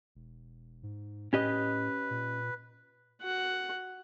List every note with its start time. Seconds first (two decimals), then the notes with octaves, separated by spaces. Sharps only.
0.15 E1
0.83 G#2
1.33 A2 C#4 G4 B4 D#5
2.10 A#2
3.22 F#4 F#5